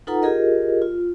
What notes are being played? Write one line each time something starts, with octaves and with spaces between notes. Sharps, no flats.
D#4 F4 A4 B4 F#5 A#5
F4 G4 G#4 A#4 D#5
F4